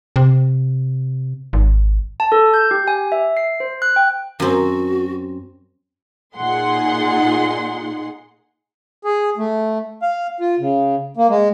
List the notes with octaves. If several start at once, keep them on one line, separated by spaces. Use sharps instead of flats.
C3
G#1
A5
A4
G6
G4
G#5
E5
C7
C5
F#6
G5
F#2 C4 F#4
A#2 D#4 G#4 F#5 C6
G#4
A3
F5
F4
C#3
A#3
G#3